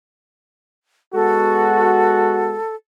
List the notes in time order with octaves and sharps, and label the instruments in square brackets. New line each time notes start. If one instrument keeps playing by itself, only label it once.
[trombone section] G#3 B3 F#4 [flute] A4